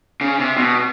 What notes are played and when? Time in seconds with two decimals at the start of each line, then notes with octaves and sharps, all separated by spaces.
0.21 C#3
0.39 C3
0.57 B2